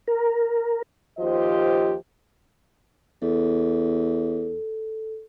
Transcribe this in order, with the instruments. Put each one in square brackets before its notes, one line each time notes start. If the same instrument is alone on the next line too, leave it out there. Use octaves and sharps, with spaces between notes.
[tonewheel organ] A#4
[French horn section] D#2 F3 F4 G4 C5 D#5
[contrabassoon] E2 [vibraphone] A4